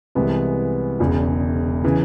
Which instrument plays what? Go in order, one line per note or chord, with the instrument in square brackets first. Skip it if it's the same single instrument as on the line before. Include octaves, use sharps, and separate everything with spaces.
[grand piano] C2 C3 E3 G#3 B3
E1 E2 C#3
C#3 E3